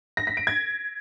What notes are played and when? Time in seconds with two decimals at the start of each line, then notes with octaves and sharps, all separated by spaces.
0.17 A#6
0.27 B6
0.37 D7
0.47 G#6